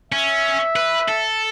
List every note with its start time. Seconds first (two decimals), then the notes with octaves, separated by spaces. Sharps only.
0.12 C#4 E5
0.76 B4
1.08 A4